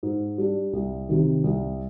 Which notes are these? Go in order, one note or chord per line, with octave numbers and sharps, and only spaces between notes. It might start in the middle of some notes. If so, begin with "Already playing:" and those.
G#2
G3 D4
C2
C3 D#3
C2